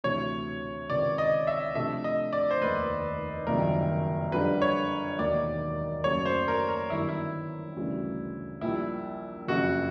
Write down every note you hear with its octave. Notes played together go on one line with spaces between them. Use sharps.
D2 C3 E3 C#5
C#2 C3 D#3 D5
D#5
E5
C3 F3 A3 D4 E5
D#5
D5
C5
F1 D#2 D#3 B4
F#1 F2 C3 D#3 G3 A#4
F2 D3 G3 B4
C#5
E1 D#2 D#3 D5
F#1 F#2 C#3 F#3 A3 C#5
C5
A#4
A#4
G1 F#2 D#3 G3 B3 E4
E4
D2 C#3 E3 G3
A#1 A#2 G3 E4
F#1 F2 C#3 F3 F#4